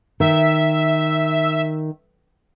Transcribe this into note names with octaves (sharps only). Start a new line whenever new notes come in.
D#3 E5